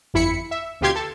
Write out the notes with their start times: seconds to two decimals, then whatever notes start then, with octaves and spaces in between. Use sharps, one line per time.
0.14 G1 F2 E4 B5 B6 C#7
0.51 E5
0.81 D2 B2 F4 G4 C6 G#6
0.95 A4